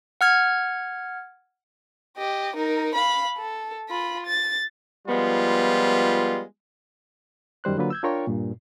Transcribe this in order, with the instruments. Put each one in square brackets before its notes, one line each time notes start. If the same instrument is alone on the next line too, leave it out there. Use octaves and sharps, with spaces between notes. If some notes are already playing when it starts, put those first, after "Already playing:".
[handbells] F#5 F6 G#6
[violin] G4 D#5
D#4 A#4
F5 B5
A4
F4 B5
A6
[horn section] F3 G3 G#3 B3 F4
[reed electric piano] F#2 D#3 G3 C5 F#6
D3 F#3 A#3 F4 B4
E6 G6 G#6
D4 F4 A#4 C#5 G5 C#6
G2 A#2